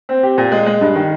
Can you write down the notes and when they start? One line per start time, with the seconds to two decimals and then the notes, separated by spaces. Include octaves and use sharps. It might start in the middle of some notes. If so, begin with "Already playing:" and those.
0.09 C4
0.23 G4
0.38 A#2
0.52 G#3
0.66 G#3
0.81 G2
0.96 D#3